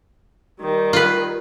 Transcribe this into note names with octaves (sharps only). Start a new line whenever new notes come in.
D#3 G3
F4 B4